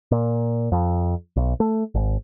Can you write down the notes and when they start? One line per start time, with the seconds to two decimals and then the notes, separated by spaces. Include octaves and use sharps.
0.12 A#2
0.72 F2
1.36 B1
1.60 A3
1.95 G#1